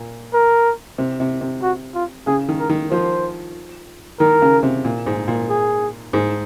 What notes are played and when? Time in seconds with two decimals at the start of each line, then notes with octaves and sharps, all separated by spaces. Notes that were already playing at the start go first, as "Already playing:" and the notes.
Already playing: A#2
0.34 A#4
0.98 C3
1.20 C3
1.41 C3
1.62 F#4
1.95 F4
2.27 C#3 G#4
2.48 D#3
2.59 A#4
2.69 D#3
2.91 F3 C5
4.20 D#3 A#4
4.42 C#3
4.63 C3
4.85 A#2
5.06 G#2
5.28 A#2
5.49 G#4
6.13 G#2